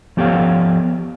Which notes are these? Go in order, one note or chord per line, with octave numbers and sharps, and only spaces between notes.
F3 B3 G4 A4 C#5 F5